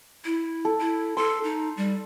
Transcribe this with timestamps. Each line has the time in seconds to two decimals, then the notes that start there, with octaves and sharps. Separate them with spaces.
0.25 E4
0.65 A4
0.79 E4
1.17 A4 C6
1.44 D#4
1.77 G3